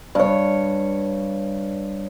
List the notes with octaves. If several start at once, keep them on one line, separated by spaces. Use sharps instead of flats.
G2 C#5